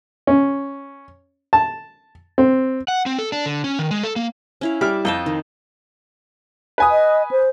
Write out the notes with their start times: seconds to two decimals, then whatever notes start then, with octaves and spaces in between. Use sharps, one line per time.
0.27 C#4
1.53 A5
2.38 C4
2.88 F#5
3.06 C4
3.18 A4
3.32 D4
3.46 D3
3.64 C#4
3.79 D#3
3.91 G#3
4.04 A4
4.16 A#3
4.61 C#4 E4 F5
4.81 G3 E5 D6 F6
5.05 F2 D#5 G5 A5
5.26 D#3
6.78 B4 G#5 D#6
6.91 D#5
7.31 C5